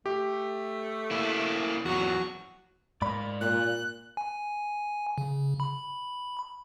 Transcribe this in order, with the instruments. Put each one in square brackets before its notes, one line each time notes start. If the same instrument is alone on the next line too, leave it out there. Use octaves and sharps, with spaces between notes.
[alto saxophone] A3 [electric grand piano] G4
[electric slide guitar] A#3 E4
[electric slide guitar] E2 F#3 [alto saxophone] F#4
[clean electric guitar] G#2 B5 [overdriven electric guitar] A#4 D5
[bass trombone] A#2 [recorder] F#6
[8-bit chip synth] G#5
C#3
B5